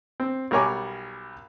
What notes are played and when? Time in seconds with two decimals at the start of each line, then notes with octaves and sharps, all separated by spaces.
0.20 C4
0.51 B1 G3 A#4 C#5 G#5 D6